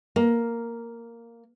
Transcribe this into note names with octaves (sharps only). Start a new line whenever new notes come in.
A#3